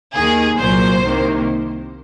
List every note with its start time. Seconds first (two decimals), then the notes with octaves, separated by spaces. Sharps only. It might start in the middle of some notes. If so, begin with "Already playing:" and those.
0.15 D#2 D#3 A#3 G#4
0.59 C2 A#2 F#3 A#3 C5
1.04 C2 C3 D#3 A#3